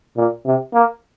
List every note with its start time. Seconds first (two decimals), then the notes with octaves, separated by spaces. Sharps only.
0.17 A#2
0.45 C3
0.74 A#3